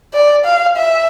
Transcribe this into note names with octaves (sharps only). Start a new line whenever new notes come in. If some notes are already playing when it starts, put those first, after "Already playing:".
D5
F5
E5